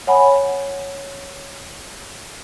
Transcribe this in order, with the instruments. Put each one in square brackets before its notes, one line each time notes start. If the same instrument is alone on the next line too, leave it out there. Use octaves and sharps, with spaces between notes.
[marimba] C#5 F#5 G#5 B5